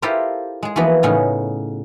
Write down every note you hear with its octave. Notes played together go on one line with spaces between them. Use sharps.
E4 F4 G4 A4 A#4 C5
G#3 G#4
E3 F3 A#3 B3 F#4 B4
A2 C#3 B3 C#4 D#4